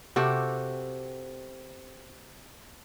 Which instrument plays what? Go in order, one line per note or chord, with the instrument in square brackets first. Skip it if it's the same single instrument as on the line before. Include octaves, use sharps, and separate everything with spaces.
[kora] C3 F#4 G4 A4